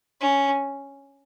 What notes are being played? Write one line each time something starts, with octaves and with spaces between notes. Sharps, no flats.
C#4